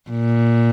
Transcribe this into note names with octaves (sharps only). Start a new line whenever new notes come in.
A#2